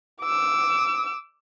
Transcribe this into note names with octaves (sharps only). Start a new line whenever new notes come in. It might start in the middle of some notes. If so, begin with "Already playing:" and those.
D6 E6